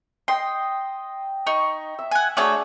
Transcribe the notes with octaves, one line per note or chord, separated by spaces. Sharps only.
D#5 G5 C6
D#4 C#6
E5
F#5 G#5
A3 D4 F#4 G#4 C#5